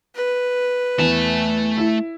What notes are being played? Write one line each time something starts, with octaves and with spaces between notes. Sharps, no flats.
B4
E2 A3 A5
E4